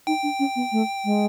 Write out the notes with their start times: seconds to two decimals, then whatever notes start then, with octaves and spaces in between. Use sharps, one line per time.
0.07 D#4 G5
0.23 D4
0.39 C#4
0.56 B3
0.72 A3
1.05 G#3